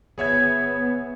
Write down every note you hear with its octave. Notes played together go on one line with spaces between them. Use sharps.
G1 B3 G#4 C#5 E5 G#6